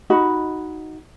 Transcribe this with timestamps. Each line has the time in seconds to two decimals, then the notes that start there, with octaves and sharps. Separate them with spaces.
0.10 D#4 F#4 D#5 B5